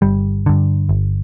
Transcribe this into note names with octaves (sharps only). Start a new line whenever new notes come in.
G1 G3
G2 D3
G1